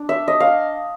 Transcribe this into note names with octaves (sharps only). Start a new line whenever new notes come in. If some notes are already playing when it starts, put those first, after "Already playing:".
Already playing: D4
E5
D#5
F5